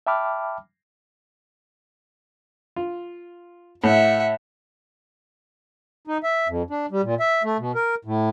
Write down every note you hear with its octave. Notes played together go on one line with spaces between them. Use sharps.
E5 G5 A5 B5 D6 F6
F4
A2 E5 F#5
D#4
E5
F2
D4
G3
A#2
E5
A3
B2
A#4
A2